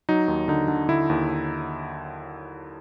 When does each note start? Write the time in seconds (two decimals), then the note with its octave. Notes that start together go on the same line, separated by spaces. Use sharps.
0.09 F#3 D#4
0.28 D#2
0.48 D3 D#4
0.68 D3
0.89 D3 E4
1.10 D#2